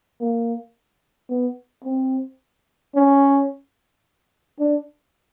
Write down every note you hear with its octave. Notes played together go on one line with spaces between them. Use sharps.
A#3
B3
C4
C#4
D4